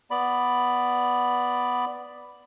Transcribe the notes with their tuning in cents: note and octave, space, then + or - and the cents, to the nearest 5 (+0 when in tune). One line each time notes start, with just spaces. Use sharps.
B3 +0 D5 +0 B5 +0